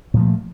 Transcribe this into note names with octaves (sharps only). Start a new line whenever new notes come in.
A#2 F3 A3